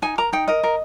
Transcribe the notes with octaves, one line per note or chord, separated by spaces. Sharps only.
D#4 G#5
A#4 A#5
D#4 G5
A#4 D#5
A#4